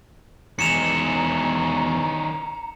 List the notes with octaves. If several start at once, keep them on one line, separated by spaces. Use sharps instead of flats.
E2 D#3 G#3 C#4 A#5 C#7 E7 F7